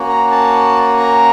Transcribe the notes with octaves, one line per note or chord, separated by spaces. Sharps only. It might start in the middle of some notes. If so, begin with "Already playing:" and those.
Already playing: A#3 C#4 F#4
A#5
A5
A#5